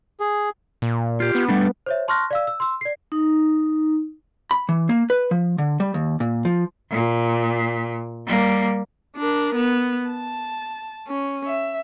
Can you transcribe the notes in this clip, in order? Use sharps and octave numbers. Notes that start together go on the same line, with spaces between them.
G#4
A#2
F4 G4
B3
G3 A3 D4
C5 C#5 E5
A5 C6 C#6 F6 F#6 A#6
D5 F5 E6
E6
C6 E6
D5 C7
D#4
B5
E3
A#3
B4
F3
D3
G3
D#2
A#2
F3
A#2
G3 A#3
D4 A#4
B3
A5
C#4
E5